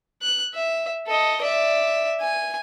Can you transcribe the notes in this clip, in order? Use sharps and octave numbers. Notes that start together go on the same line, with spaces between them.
F#6
E5
A4 D#5
D5 E5
G#5